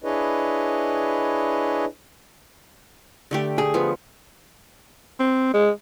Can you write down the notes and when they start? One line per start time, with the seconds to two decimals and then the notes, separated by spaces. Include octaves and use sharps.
0.04 D4 E4 G#4 B4 C#5 D#5
3.31 D3 A3 G4
3.58 G#4
3.74 F3 B3
5.19 C4
5.54 G#3